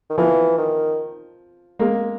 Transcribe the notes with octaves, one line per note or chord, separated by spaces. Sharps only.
D#3
E3 F3
D#3
G#3 A#3